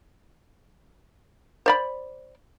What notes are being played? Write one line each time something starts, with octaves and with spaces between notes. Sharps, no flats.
C5 D5 B5